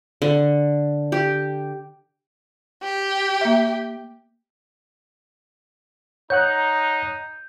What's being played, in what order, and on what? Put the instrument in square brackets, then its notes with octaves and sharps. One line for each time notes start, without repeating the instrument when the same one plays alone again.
[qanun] D3
G4
[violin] G4
[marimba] A#3 E5
[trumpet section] D#4 [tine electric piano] C#5 F#5 F#6 [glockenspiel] G6